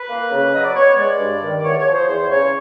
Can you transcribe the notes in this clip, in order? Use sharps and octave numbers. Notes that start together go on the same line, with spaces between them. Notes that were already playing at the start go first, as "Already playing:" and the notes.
Already playing: B4
A#3
C#3
F#3 D#5
D5
B3 C#5
G#3 D5
G2
D#3
D5
E2 C#5
C#5
F3
C5
E2 C5
C#3 C#5